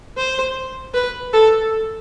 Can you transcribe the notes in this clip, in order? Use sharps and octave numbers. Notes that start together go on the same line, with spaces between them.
C5
B4
A4